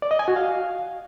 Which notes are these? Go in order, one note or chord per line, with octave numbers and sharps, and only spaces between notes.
D5
D#5
G#5
F#4
F5